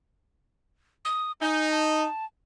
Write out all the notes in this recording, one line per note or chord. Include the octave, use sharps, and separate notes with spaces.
D#6
D#4 G#5
A5